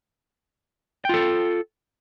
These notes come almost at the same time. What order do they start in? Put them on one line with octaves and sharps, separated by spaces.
G5 F4 A4